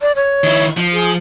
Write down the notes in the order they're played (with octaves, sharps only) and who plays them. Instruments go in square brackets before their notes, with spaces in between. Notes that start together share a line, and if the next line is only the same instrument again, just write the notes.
[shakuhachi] D5
C#5
[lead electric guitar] D#3 E4
F3
[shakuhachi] G#4